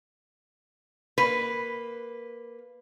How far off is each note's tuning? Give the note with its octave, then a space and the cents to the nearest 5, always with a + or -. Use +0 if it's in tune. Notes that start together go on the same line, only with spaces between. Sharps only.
A#3 +0 B4 +0